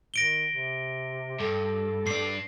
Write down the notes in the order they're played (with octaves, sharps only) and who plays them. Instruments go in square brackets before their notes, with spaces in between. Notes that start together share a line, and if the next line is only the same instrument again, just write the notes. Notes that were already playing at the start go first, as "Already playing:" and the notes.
[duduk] D#3 [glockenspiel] A#6 D7 G7
[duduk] C3
[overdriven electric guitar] G2 [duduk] A4
[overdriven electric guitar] G2 D4 [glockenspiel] C7